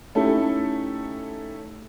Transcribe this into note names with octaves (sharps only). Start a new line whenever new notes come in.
A3 C#4 D#4 E4 G4 A4